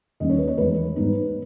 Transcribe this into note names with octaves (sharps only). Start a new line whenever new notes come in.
D#2 D#3 G3 A#3 C#4 D#5
C#5
B4
C#5
E2 D#3 G#3 B4
G#2 G3 B3 D#4